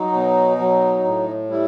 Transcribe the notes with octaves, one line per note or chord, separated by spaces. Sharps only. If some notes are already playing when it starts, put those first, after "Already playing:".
Already playing: F#3 D#4
B2
F#3
A2
G3 E4